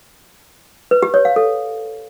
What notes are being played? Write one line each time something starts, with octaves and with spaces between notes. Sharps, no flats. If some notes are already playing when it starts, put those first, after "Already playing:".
B4
G4
C#5
F5
A4